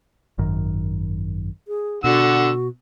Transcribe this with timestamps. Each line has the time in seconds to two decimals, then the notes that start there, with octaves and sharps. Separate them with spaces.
0.38 G#1 F#2 D#3
1.68 G#4
2.04 B2 D3 F#4 F#5 E6